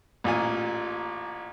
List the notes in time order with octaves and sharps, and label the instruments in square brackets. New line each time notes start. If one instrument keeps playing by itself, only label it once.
[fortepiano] A1 A#2 F4 G#5